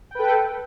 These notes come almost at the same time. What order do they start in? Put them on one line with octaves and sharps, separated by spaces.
G5 B4 A4